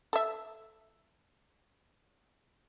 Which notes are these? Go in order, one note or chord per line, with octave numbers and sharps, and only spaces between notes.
A4 E5